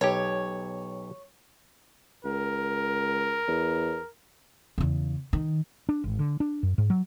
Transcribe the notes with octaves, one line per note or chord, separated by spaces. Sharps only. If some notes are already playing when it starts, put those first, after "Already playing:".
B1 G4 C#5
C#2 A#4
E2
E2 C#3
D#3
D4
G#1
D3
D4
F#2
G#2
F#3